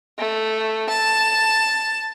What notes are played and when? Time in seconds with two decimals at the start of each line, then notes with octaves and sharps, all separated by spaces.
0.19 A3
0.89 A5